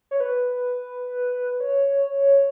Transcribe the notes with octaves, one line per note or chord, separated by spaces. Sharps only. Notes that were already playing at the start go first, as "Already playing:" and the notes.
C#5
B4
C#5